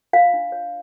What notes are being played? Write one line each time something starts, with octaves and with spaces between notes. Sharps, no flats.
F4 F5
D4
C#5